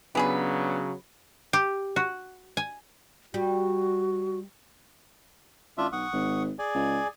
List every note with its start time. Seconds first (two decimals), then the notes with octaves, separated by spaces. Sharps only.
0.15 C#3 F#3 B3 D4 G4 G#4 B4
1.53 G4
1.96 F#4
2.57 G#5
3.34 G3 F#4
5.78 A1 D4 F4 E5
5.92 B1 F#5 C#6 D#6
6.13 G#1
6.59 G#4 D5 G#5
6.74 C#2